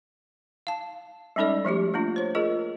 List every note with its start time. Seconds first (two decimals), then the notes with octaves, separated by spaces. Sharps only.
0.67 F5 A5
1.36 G3 G#3 C#4 D#4 A4 D5
1.65 F3 A3 F#4 G4
1.94 A3 A#3 D4 F4
2.16 C5 C#5
2.35 F4 G#4 A#4 D#5